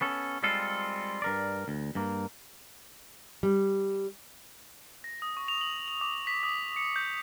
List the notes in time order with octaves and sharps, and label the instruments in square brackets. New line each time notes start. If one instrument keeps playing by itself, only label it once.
[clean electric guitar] B3 C#4 A4
G3 G#3 C4 F4 A4
G2 A#4 D5
D2
G2 A#3
[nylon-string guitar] G3
[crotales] A#6
D#6
C#6
F7
F#7
F#7
D6
B6
D#6
C#7
G6